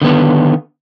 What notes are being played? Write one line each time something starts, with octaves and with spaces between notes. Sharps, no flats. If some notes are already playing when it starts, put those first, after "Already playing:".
D3 D#3 B3